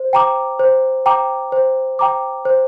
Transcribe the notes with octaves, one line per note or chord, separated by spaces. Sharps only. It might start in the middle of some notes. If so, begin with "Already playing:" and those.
Already playing: C5
G5 A#5 D6
C5
G5 A#5 D6
C5
G5 A#5 D6
C5